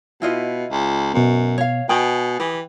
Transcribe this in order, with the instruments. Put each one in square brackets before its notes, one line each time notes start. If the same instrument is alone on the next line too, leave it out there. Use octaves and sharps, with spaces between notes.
[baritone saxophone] B2 [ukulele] E4 F4 D#5
[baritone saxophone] C#2
[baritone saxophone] F#2 [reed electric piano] B2 B3
[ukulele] C#5 F5
[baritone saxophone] B2 [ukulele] G5 [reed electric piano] G#5 D#6
[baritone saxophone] E3 [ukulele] G4